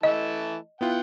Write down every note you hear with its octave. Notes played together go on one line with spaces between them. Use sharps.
E3 A3 D#5 A5
B3 E4 F4 F#5 G5